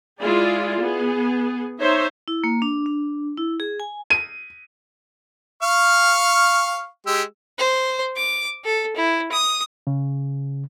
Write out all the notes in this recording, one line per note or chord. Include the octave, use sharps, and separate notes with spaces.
G#3 E4 F4 G#4 D5
B3 G#4
D#4 C5 C#5 E5
E4
A#3
D4
D4
E4
G#4
G#5
D#7
F5 C#6 F6
G#3 G4 E6
C5
D6
A4
E4
D#6
C#3